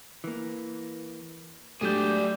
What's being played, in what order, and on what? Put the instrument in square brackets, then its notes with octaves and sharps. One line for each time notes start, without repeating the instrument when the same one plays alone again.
[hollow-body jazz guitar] E3 A#3
[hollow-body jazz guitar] G#2 F#3 [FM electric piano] A3 G6 [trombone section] D4 G4 [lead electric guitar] G#4 D5